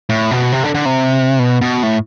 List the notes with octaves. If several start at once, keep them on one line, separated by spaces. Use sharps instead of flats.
A2
B2
C3
D3
D3
C3
B2
B2
A2